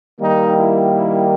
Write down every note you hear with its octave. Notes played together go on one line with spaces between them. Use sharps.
D#3 G3 A#3 D#4
E4
E4